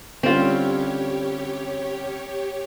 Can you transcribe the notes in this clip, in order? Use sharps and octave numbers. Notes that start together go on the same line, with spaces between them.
D3 G3 C4 C#4 F4 G4 C#5